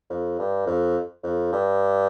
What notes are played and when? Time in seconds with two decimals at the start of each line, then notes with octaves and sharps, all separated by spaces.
0.10 F2
0.39 G2
0.66 F2
1.23 F2
1.53 G2